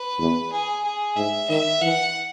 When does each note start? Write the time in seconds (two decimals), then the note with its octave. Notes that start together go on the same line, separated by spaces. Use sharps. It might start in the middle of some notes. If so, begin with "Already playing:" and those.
Already playing: B4
0.19 E2
0.52 G#4
0.84 G#4
1.16 G#2 E5
1.49 D#3 E5
1.82 E3 F#5